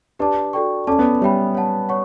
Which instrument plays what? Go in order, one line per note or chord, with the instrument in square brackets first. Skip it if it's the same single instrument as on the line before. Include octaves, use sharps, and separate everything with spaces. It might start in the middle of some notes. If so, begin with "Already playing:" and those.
[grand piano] D4 [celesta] G4 B4 D5 A5 D6
[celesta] F#4 A4 D5 G5 C#6
[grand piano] C#4 [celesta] A4 D5 A5 D6
[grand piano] B3
[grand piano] G3 [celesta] C#5 E5 G5 B5
[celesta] C#5 F#5 A5
C#5 F#5 C#6